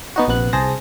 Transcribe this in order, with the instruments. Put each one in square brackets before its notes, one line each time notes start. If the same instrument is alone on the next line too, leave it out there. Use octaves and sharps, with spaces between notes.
[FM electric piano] B3 D#4 F#4
A#1 C3 B3 F#6
C2 G#4 C5 A5 A#6